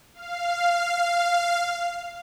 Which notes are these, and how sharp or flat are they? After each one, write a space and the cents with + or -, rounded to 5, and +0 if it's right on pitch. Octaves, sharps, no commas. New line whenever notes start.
F5 -5